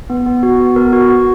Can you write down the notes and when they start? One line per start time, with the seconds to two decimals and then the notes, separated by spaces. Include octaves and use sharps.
0.10 B3
0.26 B3
0.43 F#4
0.60 B3
0.76 B3 A#4
0.93 F#4
1.10 F#4